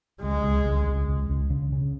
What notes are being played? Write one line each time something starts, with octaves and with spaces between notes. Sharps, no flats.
C#2 G#3
C#2
C#2
C#2
C#2
C#2
C#3
C#3